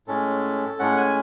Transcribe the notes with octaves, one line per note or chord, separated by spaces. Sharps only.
A2 G#3 C#4 A4
A2 G#3 C#4 F#5
G#5